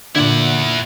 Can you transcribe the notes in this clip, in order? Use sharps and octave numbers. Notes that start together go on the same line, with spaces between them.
A#2 D3 E4 F#5